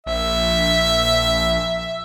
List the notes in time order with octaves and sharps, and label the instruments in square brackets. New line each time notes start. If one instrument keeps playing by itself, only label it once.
[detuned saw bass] A#1 [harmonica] E5